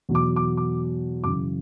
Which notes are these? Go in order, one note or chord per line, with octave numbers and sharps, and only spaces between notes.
E2 B2 F#3
D6
D6
D6
F#2 C#3 E3 D6